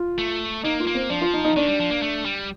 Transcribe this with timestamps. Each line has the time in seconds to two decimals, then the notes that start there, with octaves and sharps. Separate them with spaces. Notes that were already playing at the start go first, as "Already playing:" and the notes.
Already playing: F4
0.18 A3
0.63 A#3 D#4
0.80 F4
0.87 A#3
0.95 C4
1.10 F3 D4
1.21 F4
1.34 D#4
1.45 D#4
1.56 D#3 D4
1.68 G3
1.79 F3
1.91 A#3
2.02 A3
2.25 G3